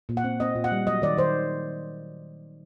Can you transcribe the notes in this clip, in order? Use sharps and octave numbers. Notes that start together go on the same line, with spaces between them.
A#2
F#5
C4
C4 D#5
A#2
F#5
G3
F#3 D#5
D#3 D5
D#3 C5